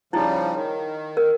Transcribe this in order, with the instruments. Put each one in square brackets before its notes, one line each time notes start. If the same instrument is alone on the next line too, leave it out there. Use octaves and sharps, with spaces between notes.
[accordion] C#3 F3 G3 [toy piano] D#4 E4
[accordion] D#3
[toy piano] A#4